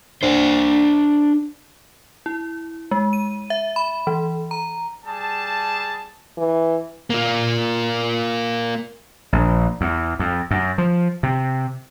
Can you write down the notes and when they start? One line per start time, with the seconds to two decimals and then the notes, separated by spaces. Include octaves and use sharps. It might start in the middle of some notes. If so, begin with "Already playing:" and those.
0.23 D4 C5
2.26 E4
2.91 G#3
3.13 D#7
3.50 E5
3.76 B5
4.07 E3
4.51 A#5
5.06 G3 G#4 A5
6.37 E3
7.10 A#3 F4
9.33 A#1
9.81 E2
10.19 F2
10.51 F#2
10.78 F3
11.23 C3